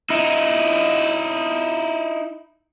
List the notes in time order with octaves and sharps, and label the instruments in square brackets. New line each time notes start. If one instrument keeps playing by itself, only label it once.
[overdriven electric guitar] D#4 E4